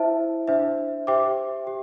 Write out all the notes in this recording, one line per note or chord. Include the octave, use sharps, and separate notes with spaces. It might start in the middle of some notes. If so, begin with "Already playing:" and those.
Already playing: E4 C5 E5 A5
D4 C5 E5
G4 C5 E5 G5 D6
G4